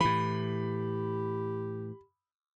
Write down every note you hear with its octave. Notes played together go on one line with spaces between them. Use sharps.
A2 E3 G4 B5